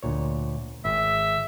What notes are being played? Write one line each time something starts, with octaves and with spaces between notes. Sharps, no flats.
D2 A#2 C#5
G#1 E5